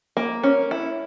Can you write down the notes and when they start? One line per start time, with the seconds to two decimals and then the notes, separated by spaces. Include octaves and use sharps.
0.17 A#3
0.43 C#4
0.71 E4